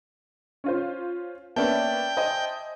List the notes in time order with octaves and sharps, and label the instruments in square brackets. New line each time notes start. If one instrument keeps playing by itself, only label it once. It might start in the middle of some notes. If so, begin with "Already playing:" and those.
[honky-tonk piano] C#4 F4 C5
[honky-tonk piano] A#3 B3 C#4 [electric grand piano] D5 E5 A5 [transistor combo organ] G5
[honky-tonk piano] C5 D#5 G#5